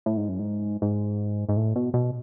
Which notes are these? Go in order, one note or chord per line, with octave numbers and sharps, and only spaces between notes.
A2
G#2
F#2
G#2
G#2
G#2
A2
B2
B2